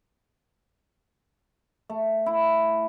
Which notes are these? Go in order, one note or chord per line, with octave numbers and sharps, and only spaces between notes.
A3
E4